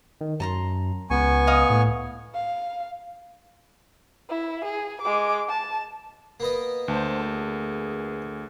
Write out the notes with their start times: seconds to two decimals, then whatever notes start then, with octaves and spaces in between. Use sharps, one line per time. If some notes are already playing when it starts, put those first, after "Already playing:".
0.21 D#3
0.40 F#2 A5 A#5 C6
1.10 C#2 B3 G#5 C#6
1.47 D#5 F5 D#6
1.70 A2
2.34 F5
4.29 E4
4.65 G#4
5.02 G#3 D6
5.49 A5
6.40 A#3 B3 D#5
6.88 D2 C5 A5
7.26 G#4